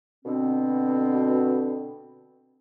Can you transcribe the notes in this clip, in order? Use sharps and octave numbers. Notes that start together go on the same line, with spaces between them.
B2 D3 C4